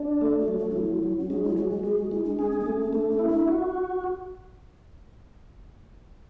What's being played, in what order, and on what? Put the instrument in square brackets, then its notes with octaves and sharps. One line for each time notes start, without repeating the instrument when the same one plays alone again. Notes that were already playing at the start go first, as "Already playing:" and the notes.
Already playing: [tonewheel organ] D4
A3
[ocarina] F#4
[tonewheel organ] F#3
[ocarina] F#4
D4
[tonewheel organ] F#3 [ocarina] E4
[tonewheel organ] F#3
[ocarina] C#4
[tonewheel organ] G#3 [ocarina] D4
[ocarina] E4
[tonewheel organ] G#3 [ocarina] F#4
[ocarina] F#4
[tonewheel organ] G#3 [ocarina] G#4
[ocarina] F#4
[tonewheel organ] G#3 [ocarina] E4
[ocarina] D4
[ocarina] C#4 [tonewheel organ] G#4
[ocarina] D4
B3
[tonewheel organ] A3 [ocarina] C#4
[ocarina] C#4
[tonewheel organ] A3 [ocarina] D4
[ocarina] C#4
[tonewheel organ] E4
[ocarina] D4
[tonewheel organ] F#4